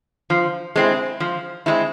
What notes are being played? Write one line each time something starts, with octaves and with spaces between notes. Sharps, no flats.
F3
G#3 C4 E4
F3
G#3 C4 E4